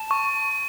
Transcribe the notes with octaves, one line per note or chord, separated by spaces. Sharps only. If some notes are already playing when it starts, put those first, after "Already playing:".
Already playing: A5
C#6